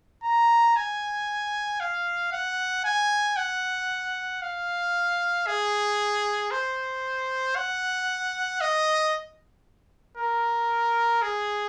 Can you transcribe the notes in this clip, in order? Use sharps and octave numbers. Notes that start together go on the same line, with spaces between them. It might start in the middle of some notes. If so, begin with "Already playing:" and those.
A#5
G#5
F5
F#5
G#5
F#5
F5
G#4
C5
F#5
D#5
A#4
G#4